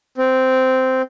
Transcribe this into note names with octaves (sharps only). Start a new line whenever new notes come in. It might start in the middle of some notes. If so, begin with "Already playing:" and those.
C4